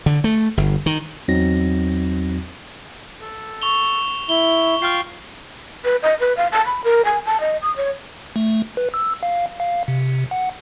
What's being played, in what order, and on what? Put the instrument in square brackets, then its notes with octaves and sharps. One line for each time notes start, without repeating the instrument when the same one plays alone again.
[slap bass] D3
A3
G1
D#3
[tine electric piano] E2 F#3 C4 D#4 F#4 A#6
[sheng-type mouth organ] A4
[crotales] C#6 F7 G7
[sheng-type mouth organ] E4 [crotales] G7
[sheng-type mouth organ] F4 F5 G5 [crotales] F6 C7
[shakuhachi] B4
D#5
B4
F5
A5
B5
A#4
G#5
A5
D#5
D#6
C#5
[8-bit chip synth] A3
B4
E6
F5
F5
C3
F#5